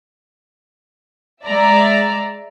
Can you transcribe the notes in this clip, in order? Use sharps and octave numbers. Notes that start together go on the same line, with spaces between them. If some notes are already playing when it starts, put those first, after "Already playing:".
G#3 D5 E5 A#5